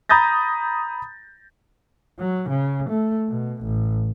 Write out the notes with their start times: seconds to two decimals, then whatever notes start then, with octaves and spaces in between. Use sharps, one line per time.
0.09 A#5 B5 D#6 G6 A6 A#6
2.19 F#3
2.49 C#3
2.89 A3
3.29 B2
3.62 A1